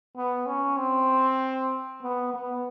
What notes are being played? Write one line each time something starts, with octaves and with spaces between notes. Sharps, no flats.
B3
C#4
C4
B3
B3